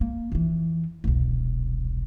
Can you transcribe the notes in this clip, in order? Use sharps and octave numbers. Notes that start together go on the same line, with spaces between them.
A#3
F2 E3
E1 C2